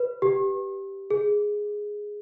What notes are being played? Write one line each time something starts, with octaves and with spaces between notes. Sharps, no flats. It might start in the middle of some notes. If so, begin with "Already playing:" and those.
Already playing: B4
G4
G#4